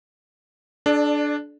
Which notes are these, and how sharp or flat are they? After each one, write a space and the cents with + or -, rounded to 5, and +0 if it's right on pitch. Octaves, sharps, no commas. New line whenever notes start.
D4 +0 A4 -45 D5 +25